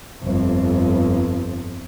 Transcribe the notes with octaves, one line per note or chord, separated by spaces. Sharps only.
G1 F2